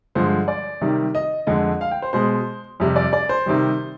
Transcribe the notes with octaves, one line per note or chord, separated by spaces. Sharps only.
G2 D3 F3 G#3 C5
D5
C3 D#3 G3
D#5
F2 D3 G#3 D#5
F5
G5
C5
B2 G#3 C5
F2 C3 G3
D5
D5
C5
C3 D#3 G3